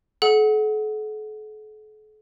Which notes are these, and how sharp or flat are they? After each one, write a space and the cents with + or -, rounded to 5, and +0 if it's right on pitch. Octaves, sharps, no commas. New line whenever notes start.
A4 -45 F#5 +0